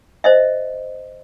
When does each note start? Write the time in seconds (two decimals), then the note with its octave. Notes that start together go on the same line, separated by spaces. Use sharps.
0.24 C5 D#5 E5